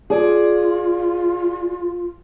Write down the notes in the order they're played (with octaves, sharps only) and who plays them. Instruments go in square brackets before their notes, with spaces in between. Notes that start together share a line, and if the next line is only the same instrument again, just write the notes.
[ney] F4 [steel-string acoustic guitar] G#4 D5